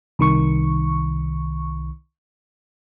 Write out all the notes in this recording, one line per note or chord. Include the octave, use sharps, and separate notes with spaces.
C2 D#3 C#6